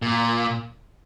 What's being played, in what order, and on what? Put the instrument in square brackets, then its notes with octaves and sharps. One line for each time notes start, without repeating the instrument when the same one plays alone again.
[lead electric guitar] A#2